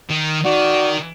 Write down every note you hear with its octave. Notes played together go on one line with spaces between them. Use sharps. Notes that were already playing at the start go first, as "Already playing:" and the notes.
D#3
D#3 F#4 D5